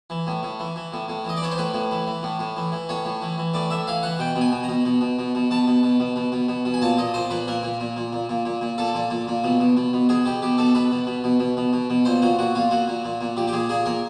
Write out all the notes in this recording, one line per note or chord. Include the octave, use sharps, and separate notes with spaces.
E3
A2
A2
E3
E3
A2
A2
E3 D#5
D5
E3 C#5
C5
A2 B4
A2
E3
E3
A2
A2
E3
E3
A2 C#5
A2
E3
E3
A2 D5
A2 E5
E3 F5
E3 F#5
B2 G5
B2
G#5
B2
B2 A#5
B2
B2
B2
B2
B2 A5
B2
B2
B2
B2
B2
B2
B2
G#5
A#2 A5
A#2 D#5
A#2 C5
A#2 B4
A#2 A#4
A#2
A#2
A#2
A#2
A#2
A#2
A#2
A#2 A4
A#2
A#2
A#2
B2
B2
B2
B2
B2 G#4
B2 G4
B2 G4
B2 A4
B2 B4
B2
B2
B2
B2
B2
B2
B2
A#2 C5
A#2 F#4
A#2 F#4
A#2 F4
A#2 F#4
A#2
A#2
A#2
A#2 G4
G4
A#2 G#4
A#2 G#4
A#2 A#4